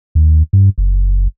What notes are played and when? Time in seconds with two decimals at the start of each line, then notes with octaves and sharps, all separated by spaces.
0.15 D#2
0.53 G2
0.78 F#1